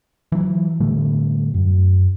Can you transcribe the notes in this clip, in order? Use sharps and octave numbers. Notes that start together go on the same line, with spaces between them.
E3 F#3
A2 D3 G3 A3
F#2